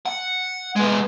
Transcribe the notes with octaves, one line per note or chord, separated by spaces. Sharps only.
F#5
G#3 B3